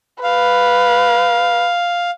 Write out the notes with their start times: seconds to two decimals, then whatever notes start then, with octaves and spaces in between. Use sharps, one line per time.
0.23 B4 F5